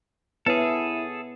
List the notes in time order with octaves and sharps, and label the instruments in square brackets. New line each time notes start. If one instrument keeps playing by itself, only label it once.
[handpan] B3 [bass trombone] E4 [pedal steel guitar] G#4 A4 [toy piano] B4 C#5 E5